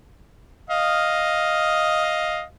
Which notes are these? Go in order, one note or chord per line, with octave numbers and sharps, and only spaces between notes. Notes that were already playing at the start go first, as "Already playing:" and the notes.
D#5 F5